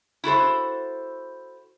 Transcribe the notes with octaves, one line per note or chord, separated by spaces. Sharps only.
E4 F#4 A4 C5